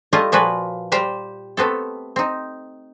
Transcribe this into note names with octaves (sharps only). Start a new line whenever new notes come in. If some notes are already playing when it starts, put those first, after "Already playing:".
G3 A3 E4 F4 D#5 A5
A#2 F3 F4 F#4 B4 C#5
G3 G4 C5 G5 A#5
A3 B3 C4 A4
C4 D#4